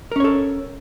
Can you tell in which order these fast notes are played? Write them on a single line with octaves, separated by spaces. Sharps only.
A#4 C#4 C#5 A4